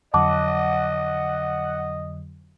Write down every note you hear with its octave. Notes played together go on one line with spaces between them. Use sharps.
F2 D3 F#3 D#5 F#5 A5 D6